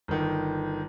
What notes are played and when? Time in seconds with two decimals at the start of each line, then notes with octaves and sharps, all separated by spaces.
0.08 G1 D#3